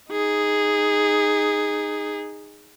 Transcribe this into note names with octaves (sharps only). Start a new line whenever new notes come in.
D#4 G#4